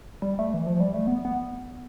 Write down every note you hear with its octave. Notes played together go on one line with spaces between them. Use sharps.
G3
A3
E3
F3
G3
A3
B3
B3